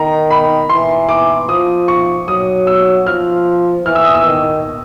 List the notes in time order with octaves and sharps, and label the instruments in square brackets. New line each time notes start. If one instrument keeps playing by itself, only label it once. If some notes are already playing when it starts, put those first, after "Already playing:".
Already playing: [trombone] D#3 [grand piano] A#5
[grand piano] B5
[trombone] E3 [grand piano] C6
[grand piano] D6
[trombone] F3 [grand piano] D#6
[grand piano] C#6
[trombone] F#3 [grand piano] D#6
[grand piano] E6
[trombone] F3 [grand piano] F6
[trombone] E3 [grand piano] F6
[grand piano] E6
D#6
E6
[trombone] D#3